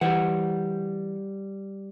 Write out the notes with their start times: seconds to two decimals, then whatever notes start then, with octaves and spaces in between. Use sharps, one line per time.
0.01 E3 G3 C5 F#5